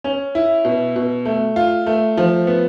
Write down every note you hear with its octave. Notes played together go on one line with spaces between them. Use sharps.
C#4
E4
B2
B2
A3
F4
A3
F3
B3